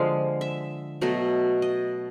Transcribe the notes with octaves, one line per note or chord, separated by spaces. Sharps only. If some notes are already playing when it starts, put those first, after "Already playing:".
Already playing: D3 F3 G#3 F5
E5
B2 F#3 A3 D#5
D#5